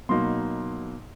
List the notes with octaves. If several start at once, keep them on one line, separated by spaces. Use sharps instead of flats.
B2 F#3 A#3 D#4 C6